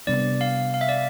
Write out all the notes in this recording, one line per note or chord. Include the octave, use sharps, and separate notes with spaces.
C3 G3 B3 D4 D5
F5
F5
E5
D5